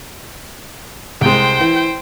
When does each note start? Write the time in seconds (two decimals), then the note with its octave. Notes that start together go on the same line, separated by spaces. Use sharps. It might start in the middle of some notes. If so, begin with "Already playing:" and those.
1.21 C2 G#3 C5 G5
1.61 E3